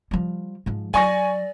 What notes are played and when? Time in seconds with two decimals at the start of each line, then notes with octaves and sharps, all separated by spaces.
0.11 F3 G3
0.66 G#2 F3
0.94 F#3 D5 G#5 C#6 A#6